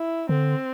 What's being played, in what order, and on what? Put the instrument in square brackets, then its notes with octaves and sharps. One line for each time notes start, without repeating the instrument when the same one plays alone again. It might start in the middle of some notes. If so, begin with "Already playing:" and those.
Already playing: [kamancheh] E4
[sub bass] D3 [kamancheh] C4